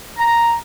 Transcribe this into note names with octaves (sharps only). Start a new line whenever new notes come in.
A#5